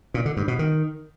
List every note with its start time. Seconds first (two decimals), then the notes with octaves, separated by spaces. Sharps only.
0.14 A#2
0.26 D3
0.37 G2
0.48 B2
0.59 D#3